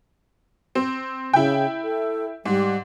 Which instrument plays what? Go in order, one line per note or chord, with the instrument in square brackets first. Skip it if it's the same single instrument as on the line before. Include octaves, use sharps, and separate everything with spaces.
[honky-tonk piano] C4
[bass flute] C#3 [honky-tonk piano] E4 G5
[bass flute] A4
[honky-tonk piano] G#2 [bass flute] G3